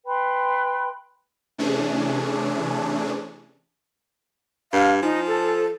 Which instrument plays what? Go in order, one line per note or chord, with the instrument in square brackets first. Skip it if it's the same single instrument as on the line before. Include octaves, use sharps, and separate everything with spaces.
[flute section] B4 G5 B5 C6
[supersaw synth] C3 E3 A3 C#4 D4 G#4
[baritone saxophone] G2 [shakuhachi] F5
[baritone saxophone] F3 [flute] D#4 [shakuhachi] G#5
[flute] A4